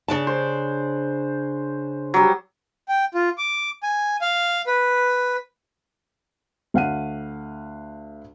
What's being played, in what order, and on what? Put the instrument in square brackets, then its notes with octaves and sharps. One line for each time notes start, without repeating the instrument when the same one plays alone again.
[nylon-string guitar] C#3 D4 A5
[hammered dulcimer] C5
F#3 G3
[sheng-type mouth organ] G5
F4
D6
G#5
F5
B4
[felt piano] D2 F5 F#5 D#7